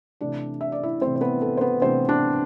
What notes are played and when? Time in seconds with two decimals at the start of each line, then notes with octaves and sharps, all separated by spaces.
0.21 C3 E3 A3 D4 D5
0.61 E5
0.72 D5
0.83 E4 E5
1.01 C3 E3 A3 C4 D4 C5
1.16 C5
1.21 B3 B4
1.42 A4
1.57 C5
1.61 B3 B4
1.81 C3 E3 A3 C4 D4 C5
2.09 D4 D5